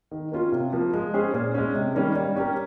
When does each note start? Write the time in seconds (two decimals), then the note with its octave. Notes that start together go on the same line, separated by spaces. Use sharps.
0.11 D#3
0.32 A#3 C#4 F4
0.52 C3
0.73 F3 A#3
0.94 G#3
1.14 C#4 G#4 C5
1.33 A#2
1.54 G#3 C#4
1.74 C3
1.95 D#3 G3 A#3 C#4
2.15 G3
2.36 C#4 G4 A#4